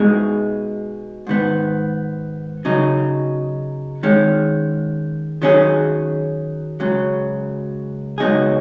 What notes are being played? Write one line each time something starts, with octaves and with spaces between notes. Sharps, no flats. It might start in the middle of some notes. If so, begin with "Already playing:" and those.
Already playing: B2 G#3 D#4 G#4
G#2 D#3 B3
C#3 F#3 D#4
D#3 G#3 C#4
D#3 F#3 C#4 G#4
C#2 C#3 F#3
C#2 B2 F#3 D#4 G#4